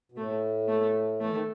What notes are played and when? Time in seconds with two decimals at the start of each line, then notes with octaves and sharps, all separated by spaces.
0.12 B2
0.17 A2 A3
0.68 A3
1.20 E3 A3
1.30 D#3